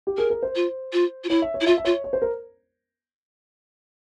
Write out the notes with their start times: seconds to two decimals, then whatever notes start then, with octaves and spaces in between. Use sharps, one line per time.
0.07 G4
0.17 G#4 A#4
0.30 A#4
0.43 C5
0.55 F4
0.93 F4
1.24 F4
1.29 E4 C#5
1.42 E5
1.54 C#5
1.61 E4
1.66 F4 E5
1.77 E5
1.85 F4 C#5
2.04 C#5
2.13 C5
2.22 A#4